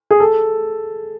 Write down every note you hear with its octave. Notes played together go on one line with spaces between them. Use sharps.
G#4
A4